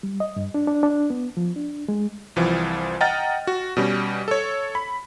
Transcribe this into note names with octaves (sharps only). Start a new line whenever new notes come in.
G3
D#5
G2
D4
D4
D4
B3
F3
D4
G#3
C2 E3 F3
D#5 F#5 G5 A#5 F6 A6
F#4
B2 G3 C#4
A4 C#5
B5